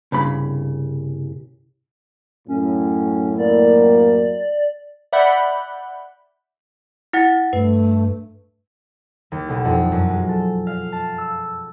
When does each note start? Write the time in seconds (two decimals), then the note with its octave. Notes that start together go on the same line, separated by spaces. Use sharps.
0.12 C2 G2 C#3 B5
2.48 F#2 A2 C#4
3.38 A#3 D5
5.13 D5 E5 F#5 B5 F#6 G6
7.13 E4 F#5 A6
7.53 G2 A3 B4
9.32 D#2
9.49 B1
9.65 F2
9.92 F#2
10.10 G#3
10.29 A4
10.67 F5
10.92 A5
11.18 E6